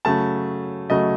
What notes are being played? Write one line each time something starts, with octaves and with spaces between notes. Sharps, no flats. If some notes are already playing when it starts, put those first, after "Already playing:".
C#3 F#3 A3 A5
C#3 F#3 A3 D#5